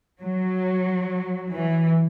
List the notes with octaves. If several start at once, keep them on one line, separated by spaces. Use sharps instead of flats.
F#3
E3